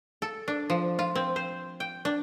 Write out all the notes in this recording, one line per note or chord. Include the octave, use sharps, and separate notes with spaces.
A4
D4
F3
F4
C4
C5
G5
D4